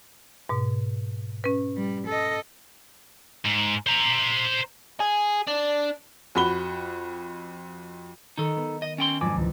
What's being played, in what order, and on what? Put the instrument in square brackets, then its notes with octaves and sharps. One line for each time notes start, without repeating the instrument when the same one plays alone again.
[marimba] G#2 B2
C#4 B4
[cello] G3
A4 D#5
[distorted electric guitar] G#2
C5 A#5
[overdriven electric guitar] G#4
D4
[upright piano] F2 F#4 B5 G7
[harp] D#3 [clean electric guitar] D#4 A4
[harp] B3
[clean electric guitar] D#5
[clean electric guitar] C#4 G5 C6 [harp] A6
[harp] F2 F#3 D4 [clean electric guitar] G#2 [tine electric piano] G#5 D6
[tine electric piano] C#2 E3